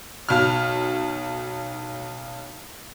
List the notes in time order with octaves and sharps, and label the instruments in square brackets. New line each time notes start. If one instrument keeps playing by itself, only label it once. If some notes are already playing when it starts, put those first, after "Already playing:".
[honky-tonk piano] B1 F6